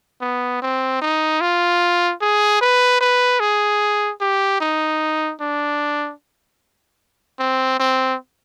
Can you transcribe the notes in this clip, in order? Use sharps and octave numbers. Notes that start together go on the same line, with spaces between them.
B3
C4
D#4
F4
G#4
B4
B4
G#4
G4
D#4
D4
C4
C4